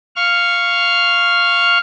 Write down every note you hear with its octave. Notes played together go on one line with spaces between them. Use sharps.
F5 C#6 F6